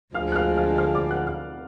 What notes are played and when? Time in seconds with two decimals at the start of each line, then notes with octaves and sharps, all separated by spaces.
0.14 D2 D3 F3 G#3 D4 F5 F6
0.32 F#6
0.36 F5 F6
0.57 F5 F6
0.78 F5 F6
0.94 D5 D6
1.10 F#5 F#6
1.26 F5 F6